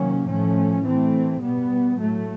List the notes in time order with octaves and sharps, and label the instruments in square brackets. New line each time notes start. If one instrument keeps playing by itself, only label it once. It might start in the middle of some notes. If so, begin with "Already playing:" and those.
Already playing: [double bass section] C3 D#3 F#3 A#3 C#4
A2 F3 A3 C#4
E3 A3 C4
B2 G3 B3
A2 F#3 A3